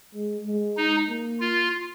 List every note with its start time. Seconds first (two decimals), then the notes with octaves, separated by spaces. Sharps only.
0.15 G#3
0.46 G#3
0.77 D#4
1.09 A#3
1.40 F4